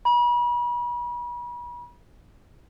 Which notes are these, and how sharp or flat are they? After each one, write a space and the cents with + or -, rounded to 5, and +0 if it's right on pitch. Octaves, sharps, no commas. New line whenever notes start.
B5 -40